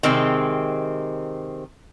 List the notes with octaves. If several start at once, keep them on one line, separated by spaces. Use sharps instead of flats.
C3 D#3 G#3 C4